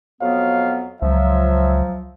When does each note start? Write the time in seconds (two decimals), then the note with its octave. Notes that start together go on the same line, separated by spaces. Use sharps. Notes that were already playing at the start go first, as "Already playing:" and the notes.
0.21 F2 F#3 B3 F5
1.02 C#2 F3 F#3 E5